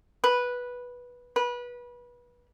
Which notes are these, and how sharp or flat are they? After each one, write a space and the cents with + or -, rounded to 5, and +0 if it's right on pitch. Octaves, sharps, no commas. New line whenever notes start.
B4 -10
B4 -25